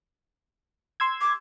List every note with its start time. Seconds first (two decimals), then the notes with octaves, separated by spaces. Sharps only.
1.00 C6 E6 G#6
1.21 D6